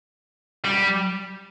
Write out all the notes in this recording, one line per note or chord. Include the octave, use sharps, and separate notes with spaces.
G3